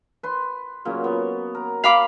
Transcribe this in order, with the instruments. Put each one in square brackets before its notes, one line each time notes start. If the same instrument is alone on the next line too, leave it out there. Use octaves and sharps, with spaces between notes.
[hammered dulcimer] B4 C6
A#2 C#3 F#3
B3
A#4
[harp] F5 B5 D6